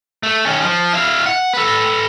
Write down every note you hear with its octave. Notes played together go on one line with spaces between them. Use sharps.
A3
D#3 C#4
F3
E4 F5
F#5
A4 B4